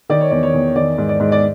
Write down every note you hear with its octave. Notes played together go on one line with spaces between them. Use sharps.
D#3 D5
C#5
E2 D5
C#5
E2
D#3 D5
G#2
D5
G#2
D5